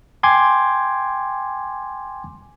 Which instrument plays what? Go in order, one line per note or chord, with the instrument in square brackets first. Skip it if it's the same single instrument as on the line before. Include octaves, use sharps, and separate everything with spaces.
[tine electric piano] G5 G#5 C6 D6 G#6